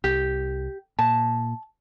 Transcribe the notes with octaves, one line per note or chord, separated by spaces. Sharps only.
C2 G4
A#2 A5